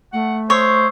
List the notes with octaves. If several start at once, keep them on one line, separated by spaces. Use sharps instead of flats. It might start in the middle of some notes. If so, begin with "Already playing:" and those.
A3 F#5
C5 C#5 C#6 D#6 E6